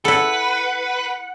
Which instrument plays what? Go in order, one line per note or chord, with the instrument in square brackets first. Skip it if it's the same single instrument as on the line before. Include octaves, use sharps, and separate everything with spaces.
[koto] E4 A4 [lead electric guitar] B4 [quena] F#5